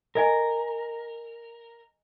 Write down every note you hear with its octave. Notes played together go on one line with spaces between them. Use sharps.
A4 A#4 D#5 G#5